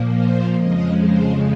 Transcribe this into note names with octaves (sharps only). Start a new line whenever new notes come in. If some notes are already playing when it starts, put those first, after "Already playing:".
Already playing: A#2 F3 A#3
C5
F2 C#3 F3 G#3 D#5
C5